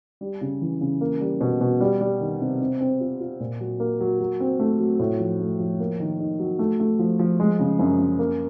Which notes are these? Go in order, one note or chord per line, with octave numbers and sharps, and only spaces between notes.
G3
C#3
E3
C#3
A#3
G3
B2
B2
G3
G3
D#3
C3
C4
C4
F4
F4
A#2
F#3
A#3
F#3
F#3
C4
A3
F#3
A2
F3
A3
F3
A#3
D#3
D#4
F#3
A3
A3
F3
F3
G#3
C#3
F#2
F#2
A#3